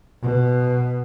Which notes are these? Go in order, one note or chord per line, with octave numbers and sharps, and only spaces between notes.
B2